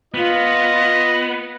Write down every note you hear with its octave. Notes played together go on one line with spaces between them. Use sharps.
B3 F4 D#5